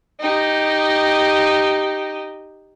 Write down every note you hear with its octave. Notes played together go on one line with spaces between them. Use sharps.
D#4 G4